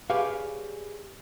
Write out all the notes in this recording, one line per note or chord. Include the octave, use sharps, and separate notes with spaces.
G4 G#4 B4 C#5 D5 F5